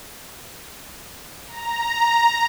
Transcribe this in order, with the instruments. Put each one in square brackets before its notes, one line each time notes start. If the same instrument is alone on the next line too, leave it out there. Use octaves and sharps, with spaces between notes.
[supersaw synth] A#5